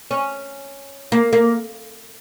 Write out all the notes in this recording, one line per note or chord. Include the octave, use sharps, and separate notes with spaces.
C#4
A#3
A#3